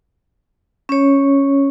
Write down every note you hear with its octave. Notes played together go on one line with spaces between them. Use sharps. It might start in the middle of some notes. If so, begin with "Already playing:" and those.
C#4 C#5